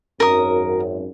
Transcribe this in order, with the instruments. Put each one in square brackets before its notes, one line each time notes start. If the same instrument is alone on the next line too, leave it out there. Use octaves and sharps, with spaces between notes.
[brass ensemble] G#1 F#2 [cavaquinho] A#4 D#6